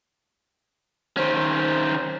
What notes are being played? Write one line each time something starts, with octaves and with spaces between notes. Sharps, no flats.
D#3 C#4 C5